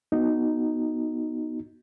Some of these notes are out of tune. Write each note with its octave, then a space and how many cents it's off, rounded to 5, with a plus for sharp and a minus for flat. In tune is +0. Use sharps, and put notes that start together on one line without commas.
B3 -10 D#4 +0 F#4 +0